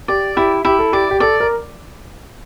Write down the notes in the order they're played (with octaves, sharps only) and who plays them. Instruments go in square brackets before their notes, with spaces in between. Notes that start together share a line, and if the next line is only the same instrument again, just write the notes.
[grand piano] G4 [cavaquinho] D5
[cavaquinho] E4 [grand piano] G4
[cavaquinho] E4 [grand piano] G4
[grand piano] A4
[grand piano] G4 [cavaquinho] D5
[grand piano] G4
[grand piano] A4 [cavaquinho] D5
[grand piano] A#4